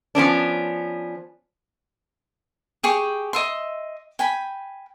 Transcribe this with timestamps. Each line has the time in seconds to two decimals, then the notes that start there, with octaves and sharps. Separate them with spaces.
0.15 F3 B3 C#4 D4
2.83 G4 G#4 G5 C#6
3.33 D#5 E5 C6
4.19 G5 G#5 B5